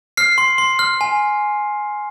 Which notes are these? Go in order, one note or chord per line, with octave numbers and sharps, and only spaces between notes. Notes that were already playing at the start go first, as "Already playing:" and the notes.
F6 C7
C6
C6
F6
G#5